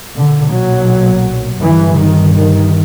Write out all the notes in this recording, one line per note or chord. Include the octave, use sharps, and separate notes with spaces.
B1 A#2 D3
F#3
G1 G2 E3
D#3
D#3